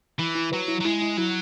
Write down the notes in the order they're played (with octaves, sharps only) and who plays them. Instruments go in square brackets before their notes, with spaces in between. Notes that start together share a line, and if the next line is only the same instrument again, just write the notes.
[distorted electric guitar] E3 [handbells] E4
[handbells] E4
[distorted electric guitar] F#3 [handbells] B4
[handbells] E4
[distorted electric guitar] F#3
[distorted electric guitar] G#3 [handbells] E4
[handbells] E4
[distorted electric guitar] F#3 [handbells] E4